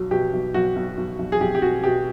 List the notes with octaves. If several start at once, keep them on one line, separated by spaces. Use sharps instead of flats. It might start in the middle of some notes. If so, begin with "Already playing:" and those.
Already playing: B1 F#3
B2 G4
B1
B1 F#4
B1
B1
B1
G#4
B1 G4
G4
B2 F#4
B2 G4